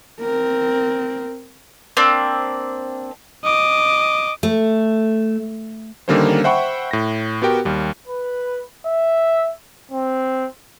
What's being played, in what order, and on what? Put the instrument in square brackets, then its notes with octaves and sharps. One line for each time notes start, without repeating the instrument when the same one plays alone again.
[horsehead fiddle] C4 A#4
[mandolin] A#3 C4 D4
[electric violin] D#5 D6
[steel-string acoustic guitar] A3
[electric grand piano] D3 D#3 G3 A#3 C#4 C5
C5 E5 F#5 G5 B5 C#6
A2 A#6
B3 F#4 G4 A#4 G5
D#2 G3
[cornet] B4
E5
C4